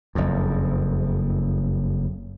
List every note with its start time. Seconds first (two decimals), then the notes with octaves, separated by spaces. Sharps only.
0.15 F#1 F2